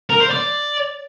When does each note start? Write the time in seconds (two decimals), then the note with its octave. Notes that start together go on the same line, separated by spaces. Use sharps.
0.10 A#4
0.20 C5
0.31 D5